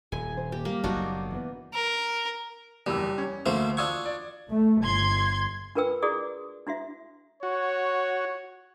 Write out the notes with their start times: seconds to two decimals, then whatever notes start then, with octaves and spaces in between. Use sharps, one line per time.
0.12 D#1 G#5
0.37 C5
0.52 A#3 G4
0.65 G3 A#3
0.84 F#1 B2 F#3 D4 D#4 F#4
1.30 E3 B3
1.74 A#4
2.86 F#1 E2 G3 E6
3.18 C#4
3.46 D2 D3 A3 A#3 C5
3.77 D4 F4 C#6 D#6 E6 G#6
4.05 D5
4.50 A3
4.82 G1 C6 G#6
5.75 D4 F4 A#4 B4 G5 E6
6.02 E4 F#4 G#4 D5 D#6
6.67 D4 E4 F#4 E5
7.43 F#4 C#5